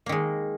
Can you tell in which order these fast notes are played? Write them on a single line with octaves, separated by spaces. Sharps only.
A#3 D#3 G#3